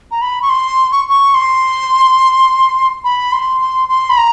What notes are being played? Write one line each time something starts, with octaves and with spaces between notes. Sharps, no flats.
A#5
B5
C#6
C6
C#6
C#6
C6
B5
C6
C6
C6
B5
A#5